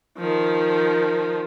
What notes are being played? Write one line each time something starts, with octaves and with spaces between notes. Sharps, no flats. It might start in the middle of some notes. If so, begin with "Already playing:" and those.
D#3 F3